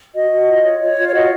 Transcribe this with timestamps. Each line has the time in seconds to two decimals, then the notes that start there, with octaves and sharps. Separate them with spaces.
0.14 F#4 D#5
0.31 F#4
0.48 F4
0.63 C#5
0.81 F4 C#5
0.97 F4
1.07 C#5
1.14 F#4 D#5